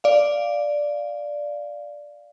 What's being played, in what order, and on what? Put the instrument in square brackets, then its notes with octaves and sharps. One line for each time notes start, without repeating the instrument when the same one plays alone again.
[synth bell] D5 F5